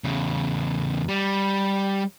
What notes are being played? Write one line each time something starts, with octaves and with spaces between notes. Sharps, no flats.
E2 C#3
G3